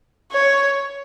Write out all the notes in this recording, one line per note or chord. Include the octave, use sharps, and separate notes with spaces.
C#5